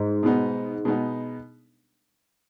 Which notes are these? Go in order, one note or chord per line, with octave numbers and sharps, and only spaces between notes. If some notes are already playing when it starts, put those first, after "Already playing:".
Already playing: G#2
B2 G#3 B3 D#4
B2 G#3 B3 D#4